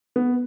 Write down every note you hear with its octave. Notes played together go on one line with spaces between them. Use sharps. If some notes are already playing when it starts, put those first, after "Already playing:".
B3